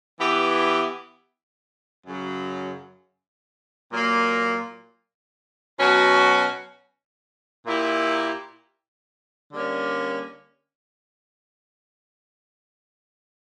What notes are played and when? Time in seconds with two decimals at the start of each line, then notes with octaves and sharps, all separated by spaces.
0.19 E3 B3 E4 G4
2.06 F#2 C#3 F#3
3.93 A#2 F#3 A#3
5.80 B2 F#3 C#4 F#4
7.65 A#2 A#3 E4 G4
9.53 D3 G3 A#3 C#4